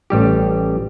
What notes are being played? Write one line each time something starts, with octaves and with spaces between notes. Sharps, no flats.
A1 G3 G4